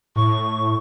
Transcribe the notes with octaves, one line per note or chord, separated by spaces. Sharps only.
A2 C#6